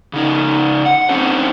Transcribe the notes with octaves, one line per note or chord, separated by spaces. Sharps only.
C#3 D#4
F#5
C4 C#4 D#4 A4 C5